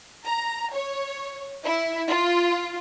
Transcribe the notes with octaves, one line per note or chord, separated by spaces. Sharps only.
A#5
C#5
E4
F4